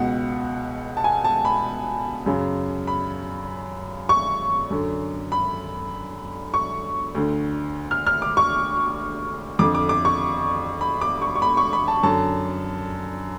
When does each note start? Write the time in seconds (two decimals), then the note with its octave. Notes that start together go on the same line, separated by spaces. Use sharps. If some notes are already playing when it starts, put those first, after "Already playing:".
Already playing: C#2 B2 F#5
0.97 A5
1.04 G#5
1.24 A5
1.45 B5
2.26 F#2 C#3
2.87 B5
4.09 C#6
4.70 F#2 D3
5.32 B5
6.54 C#6
7.15 D2 D3
7.91 F6
8.07 F6
8.22 D6
8.37 C#6
9.59 F2 D6
9.62 D3
9.75 D6
9.89 D6
10.05 C#6
10.81 B5
11.01 D6
11.22 C#6
11.36 C#6
11.42 B5
11.57 C#6
11.73 B5
11.88 A5
12.03 F#2 D3 A5